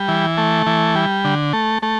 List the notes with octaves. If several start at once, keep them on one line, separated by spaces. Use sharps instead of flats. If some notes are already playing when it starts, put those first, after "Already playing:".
Already playing: G3
E3
A3
E3
G3
D3
A3
A3